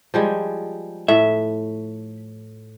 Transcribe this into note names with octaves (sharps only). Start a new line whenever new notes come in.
F3 G3 G#3
A2 E5